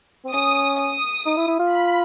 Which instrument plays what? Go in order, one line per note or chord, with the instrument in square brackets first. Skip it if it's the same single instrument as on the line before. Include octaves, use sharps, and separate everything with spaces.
[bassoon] C4
[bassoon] C#4 [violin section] D#6
[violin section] D#6
[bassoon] D#4
E4
E4
F4
[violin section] B5